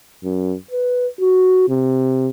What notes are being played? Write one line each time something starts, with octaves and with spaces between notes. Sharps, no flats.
F#2
B4
F#4
C3